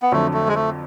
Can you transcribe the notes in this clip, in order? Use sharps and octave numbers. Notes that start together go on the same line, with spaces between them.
B3
F2 D3 F#3 A3
A3
G#3
A3